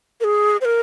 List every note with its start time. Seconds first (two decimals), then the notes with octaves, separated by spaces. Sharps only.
0.21 A#4
0.24 G#4
0.61 C5
0.65 A#4